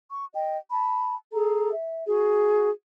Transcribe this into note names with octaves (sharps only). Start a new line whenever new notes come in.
C#6
D#5 G5
A5 B5
G#4 A4 A#5
E5
F#4 G#4